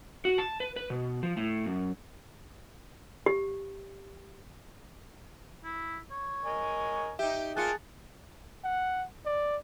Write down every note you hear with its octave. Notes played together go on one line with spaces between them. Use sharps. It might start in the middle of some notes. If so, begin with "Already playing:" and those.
F#4
A5
B4
B4
B2
F3
A2
F#2
G4
E4
C#5
A#4 D#5 G#5
D#4 G4 E5
A#3 F4 G#4 A5 F#6 C#7
F#5
D5